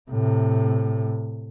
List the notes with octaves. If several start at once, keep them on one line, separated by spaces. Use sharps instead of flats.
A2 C3